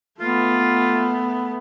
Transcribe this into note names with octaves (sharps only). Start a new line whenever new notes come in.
A3 B3 F4